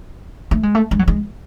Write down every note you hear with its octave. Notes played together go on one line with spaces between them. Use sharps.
A3
G#3
A3
G#3
F#3
G#3